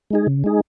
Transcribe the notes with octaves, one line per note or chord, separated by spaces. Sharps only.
G#3 D#4 G#4
C#3
G#3 D#4 G#4